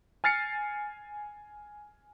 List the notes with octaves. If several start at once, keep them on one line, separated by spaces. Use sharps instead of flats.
G#5 F6 A6 C7 C#7